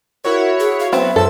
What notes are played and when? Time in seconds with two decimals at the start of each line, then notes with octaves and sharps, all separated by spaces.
0.25 E4 F#4 A#4 C#5
0.60 G#4
0.80 F5
0.93 F#3 B3 C4 E5
1.16 F#2 F3 A4 E6